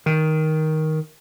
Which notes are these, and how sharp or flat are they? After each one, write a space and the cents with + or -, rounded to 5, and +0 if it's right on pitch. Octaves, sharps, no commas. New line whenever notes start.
D#3 +10